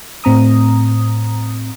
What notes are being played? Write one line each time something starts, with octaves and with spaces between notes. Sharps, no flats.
A2 C4 A#5 D#6